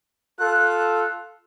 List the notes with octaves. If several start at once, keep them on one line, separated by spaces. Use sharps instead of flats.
F4 A4 F#6